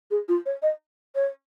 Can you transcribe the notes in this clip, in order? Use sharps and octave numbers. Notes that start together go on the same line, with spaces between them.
G#4
F4
C#5
D#5
C#5